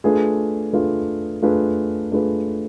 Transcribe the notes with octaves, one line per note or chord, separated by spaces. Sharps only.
A3 D4 F4 G#4 B4
A3 D4 F4 G#4 B4
A3 D4 F4 G#4 B4
A3 D4 F4 G#4 B4